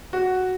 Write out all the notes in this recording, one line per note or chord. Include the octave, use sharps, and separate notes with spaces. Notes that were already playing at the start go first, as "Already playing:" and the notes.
F#4